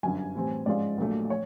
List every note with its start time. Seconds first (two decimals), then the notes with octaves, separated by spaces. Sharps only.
0.03 G1 F#2 D3 G#5
0.35 A2 E3 G3 C4
0.66 G#2 F3 G#3 C#4 F4 D5
0.98 A#1 A#2 F#3 A3
1.30 C#5